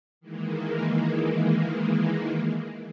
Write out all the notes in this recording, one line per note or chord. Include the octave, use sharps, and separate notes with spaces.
D#3 E3 G#3 A#3